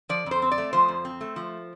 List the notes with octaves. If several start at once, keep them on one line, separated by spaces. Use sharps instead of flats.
F3 D5
F2 C5
C4
D5
A3
F3 C5
F2
C4
A3
F3